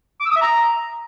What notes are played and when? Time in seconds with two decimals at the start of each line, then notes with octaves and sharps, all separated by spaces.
0.20 D6
0.26 E6
0.31 D#6
0.36 E5
0.41 A#5